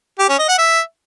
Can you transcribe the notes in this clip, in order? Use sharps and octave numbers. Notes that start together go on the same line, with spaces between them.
G4
C#4
D#5
F#5
E5